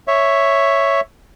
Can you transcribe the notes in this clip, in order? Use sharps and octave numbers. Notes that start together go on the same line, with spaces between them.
C#5 E5